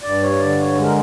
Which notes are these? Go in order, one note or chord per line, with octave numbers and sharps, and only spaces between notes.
G2 D5
C#5
D3 D5
C#5
G#3
A#4